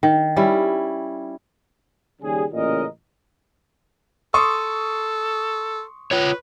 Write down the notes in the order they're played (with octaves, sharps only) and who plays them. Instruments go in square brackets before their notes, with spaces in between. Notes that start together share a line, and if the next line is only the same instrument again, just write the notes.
[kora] D#3
G3 C#4 E4
[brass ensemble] D#2 C#3 G3 G#4
A1 A#2 C#3 A#4 D#5
[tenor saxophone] A4 [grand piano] C6 C#6 D#6
[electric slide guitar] F4 C#5 [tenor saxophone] B4